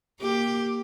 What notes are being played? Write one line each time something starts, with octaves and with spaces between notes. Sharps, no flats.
A#3 G4